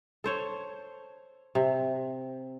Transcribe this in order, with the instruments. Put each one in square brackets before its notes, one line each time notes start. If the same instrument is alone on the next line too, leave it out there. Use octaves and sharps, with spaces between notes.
[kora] A4 C5 C#5
C3